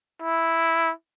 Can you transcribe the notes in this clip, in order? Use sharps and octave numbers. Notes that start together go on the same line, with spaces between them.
E4